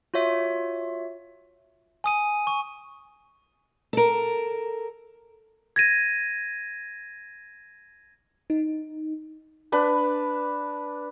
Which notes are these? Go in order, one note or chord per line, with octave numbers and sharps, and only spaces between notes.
F4 F#4 C#5 E5
G#5 D#6 D#7
C#6
A4 A#4
G#6 A#6 D#7
D#4
D4 B4